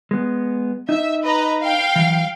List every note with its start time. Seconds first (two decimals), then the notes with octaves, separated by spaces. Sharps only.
0.11 G#3 B3
0.89 D#4 E5
1.23 B4 D#5 A#5
1.61 F5 G5
1.96 E3 F#3